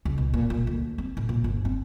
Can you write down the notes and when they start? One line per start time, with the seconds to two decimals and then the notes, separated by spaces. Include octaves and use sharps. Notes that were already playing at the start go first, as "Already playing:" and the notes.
0.05 C#2
0.18 B2
0.34 A#2
0.50 A#2
0.67 D2
0.98 C4
1.17 A2
1.29 A#2
1.44 G1
1.65 C4